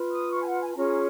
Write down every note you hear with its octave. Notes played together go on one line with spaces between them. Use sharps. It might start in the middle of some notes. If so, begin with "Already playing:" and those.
Already playing: F4 B4
D#6
C#6
G#5
F#5
G#5
G#5
C#4 F4 G#4 A#5